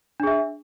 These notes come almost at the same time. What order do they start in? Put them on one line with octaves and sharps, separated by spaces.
D4 G#4 E5